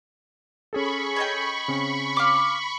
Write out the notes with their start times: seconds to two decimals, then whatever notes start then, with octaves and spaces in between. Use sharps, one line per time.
0.73 C#4 G#4 A4 B5 C#6
1.16 C#5 D#5 G5
1.68 C#3 C4 C#4
2.17 F5 D6